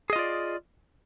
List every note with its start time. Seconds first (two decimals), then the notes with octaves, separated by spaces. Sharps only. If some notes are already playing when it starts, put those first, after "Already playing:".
0.10 G#4
0.13 D#5
0.16 F4
0.19 D5